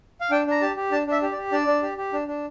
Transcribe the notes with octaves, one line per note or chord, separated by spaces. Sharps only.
F5
D4 G5
D4 A#5
G4 A5
G4
D4 A5
D4 E5
G4
D5
G4
D4 D5
D4
G4
G4
D4
D4